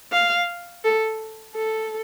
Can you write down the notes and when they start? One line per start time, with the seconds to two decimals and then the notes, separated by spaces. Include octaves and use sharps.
0.12 F5
0.84 A4
1.55 A4